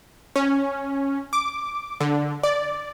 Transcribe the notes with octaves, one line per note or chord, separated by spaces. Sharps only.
C#4
D6
D3
D5